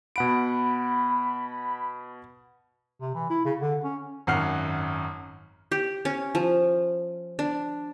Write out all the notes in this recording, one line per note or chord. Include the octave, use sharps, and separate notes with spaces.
B2 F#5 B5 D7
C3
E3
E4
C#3
D3
C#4
G#1 F#2 F#5 F6 C7
G4
C#4
F3
D4